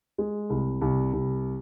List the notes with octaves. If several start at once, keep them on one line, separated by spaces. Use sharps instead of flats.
G#3
C2
C2
C2